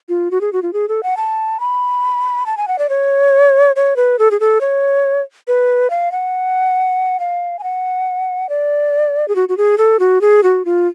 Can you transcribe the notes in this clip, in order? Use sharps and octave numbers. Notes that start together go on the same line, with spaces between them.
F4
F#4
G#4
F#4
F4
G#4
A4
F#5
A5
B5
A5
G#5
F#5
D5
C#5
C#5
B4
A4
G#4
A4
C#5
B4
F5
F#5
F5
G#5
F#5
D5
G#4
F#4
F#4
G#4
A4
F#4
G#4
F#4
F4